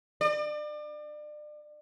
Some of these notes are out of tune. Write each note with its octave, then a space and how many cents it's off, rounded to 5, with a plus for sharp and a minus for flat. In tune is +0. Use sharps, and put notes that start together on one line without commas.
D5 +35